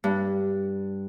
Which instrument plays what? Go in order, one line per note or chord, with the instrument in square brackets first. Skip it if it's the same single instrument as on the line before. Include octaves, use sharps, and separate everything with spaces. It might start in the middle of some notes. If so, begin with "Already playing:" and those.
[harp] G2